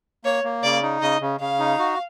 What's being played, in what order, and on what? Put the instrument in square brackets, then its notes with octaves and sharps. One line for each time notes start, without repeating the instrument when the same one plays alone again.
[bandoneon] A#3 [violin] C#5
[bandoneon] A#3
[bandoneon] C#3 [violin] D5
[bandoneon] D#4
[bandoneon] C#3 [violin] D#5
[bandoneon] C#3
[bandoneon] C#3 [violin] F5
[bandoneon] D#4
F#4